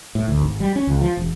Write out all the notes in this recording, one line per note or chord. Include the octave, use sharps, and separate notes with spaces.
A2
D2
G#1
G3
C#4
C#2
F3
E1